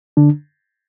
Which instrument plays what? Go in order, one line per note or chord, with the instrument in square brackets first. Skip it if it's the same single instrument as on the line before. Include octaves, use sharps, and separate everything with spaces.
[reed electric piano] D3 D4